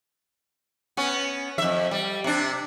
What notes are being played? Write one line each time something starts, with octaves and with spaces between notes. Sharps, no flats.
B3 C#4
F2 E5
G3
C3 D4